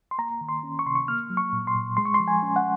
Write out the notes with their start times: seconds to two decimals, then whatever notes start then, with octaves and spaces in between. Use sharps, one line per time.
0.11 C6
0.18 A#3 A#5
0.41 D#3
0.49 C6
0.63 C#4
0.79 C#6
0.86 C3 C6
0.95 C#6
1.08 A#3 F6
1.30 F#3
1.37 C#6
1.53 A#2
1.67 C6
1.75 A#2
1.97 G#3 C6
2.05 C#6
2.14 C6
2.20 F3
2.28 G#5
2.42 C#4
2.56 F#5